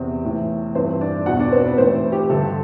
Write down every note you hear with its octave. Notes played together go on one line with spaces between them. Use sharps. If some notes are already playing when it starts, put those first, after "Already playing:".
Already playing: E2 C3 C4
A2 E3
G2 E3 C4 C5
D4 D5
E2 B2 F#4 F#5
D4 D5
C4 C5
B3 B4
A2 E3 C4 C5
G4
G2 D3 A4